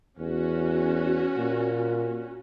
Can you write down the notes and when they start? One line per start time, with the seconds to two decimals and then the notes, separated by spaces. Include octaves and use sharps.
0.18 E2 C#4 F#4
1.37 A#2